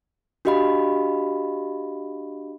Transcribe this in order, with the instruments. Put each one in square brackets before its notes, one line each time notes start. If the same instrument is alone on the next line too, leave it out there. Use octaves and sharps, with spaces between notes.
[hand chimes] D4 F#4 G4 D#5 F5 B5